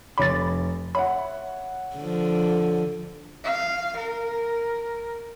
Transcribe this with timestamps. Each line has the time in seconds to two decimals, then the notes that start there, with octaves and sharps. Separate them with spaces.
0.18 F1 C#5 B5 D6 A6
0.95 C#5 E5 F#5 B5
1.96 D3 F3
3.44 F5
3.97 A#4